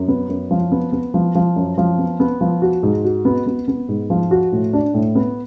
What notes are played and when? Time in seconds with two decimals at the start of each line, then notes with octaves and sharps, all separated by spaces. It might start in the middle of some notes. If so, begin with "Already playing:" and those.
Already playing: F#2
0.08 B3
0.29 F#2
0.51 F3
0.72 B3
0.92 B3
1.14 F3
1.35 F3
1.56 F#2
1.78 F3
1.98 B3
2.20 B3
2.41 F3
2.62 F#4
2.83 G#2
3.04 F#4
3.25 B3
3.47 B3
3.68 B3
3.88 G#2
4.10 F3
4.31 F#4
4.52 A2
4.73 D4
4.94 A2
5.15 B3